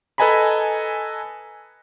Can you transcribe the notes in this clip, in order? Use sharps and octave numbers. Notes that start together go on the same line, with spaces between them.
A4 B4 D#5 G#5 A#5 B5